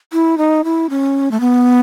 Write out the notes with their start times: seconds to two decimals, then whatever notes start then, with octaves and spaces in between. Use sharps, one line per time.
0.13 E4
0.38 D#4
0.64 E4
0.90 C#4
1.31 A3
1.40 B3